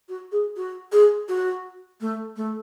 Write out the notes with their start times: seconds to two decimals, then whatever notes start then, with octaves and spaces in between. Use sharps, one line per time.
0.09 F#4
0.32 G#4
0.56 F#4
0.92 G#4
1.29 F#4
2.01 A3
2.37 A3